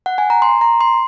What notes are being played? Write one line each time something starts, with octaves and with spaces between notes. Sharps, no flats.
F#5
G#5
A#5
C6
A#5
C6